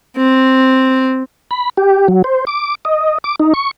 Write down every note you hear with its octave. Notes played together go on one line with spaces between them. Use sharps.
C4
B5
G4
F#3
C5
D6
D#5
D6
D#4
C#6